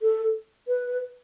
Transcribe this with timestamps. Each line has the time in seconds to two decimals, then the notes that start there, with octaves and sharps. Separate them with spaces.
0.02 A4
0.68 B4